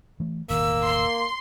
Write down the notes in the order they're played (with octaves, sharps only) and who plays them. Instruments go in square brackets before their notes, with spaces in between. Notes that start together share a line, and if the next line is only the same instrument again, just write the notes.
[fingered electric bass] E3 A3
[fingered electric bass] E1 A1 D#3 [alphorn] A#3 [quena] E6
[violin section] C6